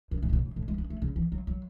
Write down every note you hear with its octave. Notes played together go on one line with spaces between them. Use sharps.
F#2
G#2
B2
A2
G#2
A2
G#3
B3
A3
C#3
E3
F#3
F#3